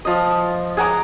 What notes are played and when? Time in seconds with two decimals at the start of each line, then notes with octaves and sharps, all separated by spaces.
0.05 F3 D#5
0.77 G#4 F#5 A#5 D6